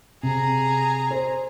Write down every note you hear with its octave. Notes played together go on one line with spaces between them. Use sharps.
C3 G#4 A#5
C5